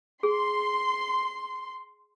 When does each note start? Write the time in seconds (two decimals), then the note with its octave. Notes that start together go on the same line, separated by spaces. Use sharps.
0.23 G#4 C6